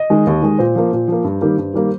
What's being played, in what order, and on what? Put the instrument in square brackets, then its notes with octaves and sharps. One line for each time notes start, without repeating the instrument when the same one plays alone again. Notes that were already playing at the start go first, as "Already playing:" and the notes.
Already playing: [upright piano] D#5
D#3 G#3
D#2
D#3 G#3
A#2 C5
F3 A#3
A#2
F3 A#3
G2
D#3 G3 A#3
G2
D#3 G3 A#3